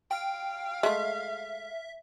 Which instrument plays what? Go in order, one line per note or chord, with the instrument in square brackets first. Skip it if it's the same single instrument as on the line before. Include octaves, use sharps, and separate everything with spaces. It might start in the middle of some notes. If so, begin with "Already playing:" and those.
[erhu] F5 [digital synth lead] G5
[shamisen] G#3 A3 [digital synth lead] E5